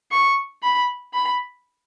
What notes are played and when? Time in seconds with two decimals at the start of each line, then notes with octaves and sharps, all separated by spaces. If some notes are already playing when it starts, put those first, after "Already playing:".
0.11 C#6
0.63 B5
1.13 B5